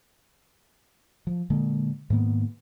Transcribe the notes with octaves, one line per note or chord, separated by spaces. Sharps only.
F3
A#2 D3 G#3 A#3
G#2 D#3 A#3 B3